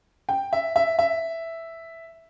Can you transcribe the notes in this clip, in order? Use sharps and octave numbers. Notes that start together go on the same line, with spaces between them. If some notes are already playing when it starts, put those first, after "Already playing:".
G5
E5
E5
E5